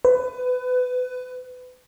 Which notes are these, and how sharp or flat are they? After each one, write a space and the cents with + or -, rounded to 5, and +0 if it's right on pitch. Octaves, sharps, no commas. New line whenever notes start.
B4 +25